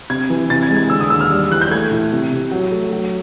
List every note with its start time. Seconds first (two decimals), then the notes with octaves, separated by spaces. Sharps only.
0.10 C3 G#6
0.30 E3
0.50 C3 A6
0.63 G#6
0.70 G#3
0.77 G#6
0.90 D3 E6
1.01 D#6
1.10 D#2 E6
1.21 F6
1.30 G3
1.51 E3 F#6
1.61 G6
1.71 A3 G#6
1.91 A2
2.12 C3
2.31 C3
2.51 F#3
2.72 A3
2.93 F#3